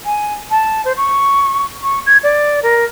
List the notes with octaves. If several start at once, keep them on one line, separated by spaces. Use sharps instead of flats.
G#5
A5
C5
C#6
C#6
G#6
D5
A#4